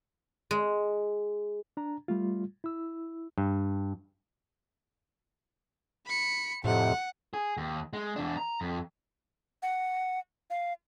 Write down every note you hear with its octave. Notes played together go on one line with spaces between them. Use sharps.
G#3
D4 A#5
G3 A3 F4
E4 E6
G2
B5 C#7
F2 A2 C3 F#5
G#4
D#2
G#3
E2 D4
A#5
F2
F#5
F5